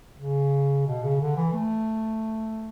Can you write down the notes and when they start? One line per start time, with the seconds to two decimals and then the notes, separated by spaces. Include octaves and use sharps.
0.19 C#3
0.87 B2
1.03 C#3
1.21 D3
1.36 E3
1.53 A3